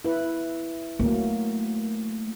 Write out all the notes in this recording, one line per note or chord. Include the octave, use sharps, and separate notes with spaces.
E4 B4
F#3 A3 A#3